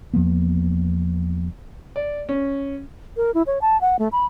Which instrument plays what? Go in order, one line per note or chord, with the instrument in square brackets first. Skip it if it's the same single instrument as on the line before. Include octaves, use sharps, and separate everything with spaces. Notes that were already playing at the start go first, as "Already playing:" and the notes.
[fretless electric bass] E2 F3 A#3 B3
[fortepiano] D5
C#4
[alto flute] A#4
E4
C#5
A5
F#5
A3
B5